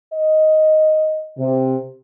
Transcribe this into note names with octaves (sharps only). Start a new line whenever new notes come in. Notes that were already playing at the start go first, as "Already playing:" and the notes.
D#5
C3